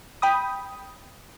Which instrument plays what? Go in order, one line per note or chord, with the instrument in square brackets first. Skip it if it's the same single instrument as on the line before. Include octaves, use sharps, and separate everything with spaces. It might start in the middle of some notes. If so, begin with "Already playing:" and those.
[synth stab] G5 B5 D#6